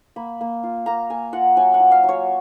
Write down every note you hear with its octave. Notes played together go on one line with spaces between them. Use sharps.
A#3 B5
A#3
F4
A#3 A#5
A#3 G#5
F4 F#5
F#3 G#5
F#5
F4
F5
F#3
C#5